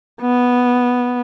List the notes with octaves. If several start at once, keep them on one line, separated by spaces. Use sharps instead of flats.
B3